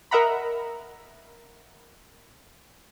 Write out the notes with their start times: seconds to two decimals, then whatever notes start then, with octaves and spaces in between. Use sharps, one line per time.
0.11 A#4 D#5 E5 F#5 A#5 B5